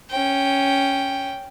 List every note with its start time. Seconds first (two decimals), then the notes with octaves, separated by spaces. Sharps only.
0.11 C#4 G5